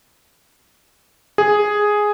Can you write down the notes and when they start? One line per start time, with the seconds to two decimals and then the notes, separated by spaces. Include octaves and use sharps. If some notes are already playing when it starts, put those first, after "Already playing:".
1.38 G#4